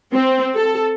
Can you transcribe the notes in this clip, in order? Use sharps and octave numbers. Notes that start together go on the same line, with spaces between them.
C4
A4